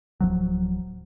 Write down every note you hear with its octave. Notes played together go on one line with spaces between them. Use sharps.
D1 F2 F3 F#3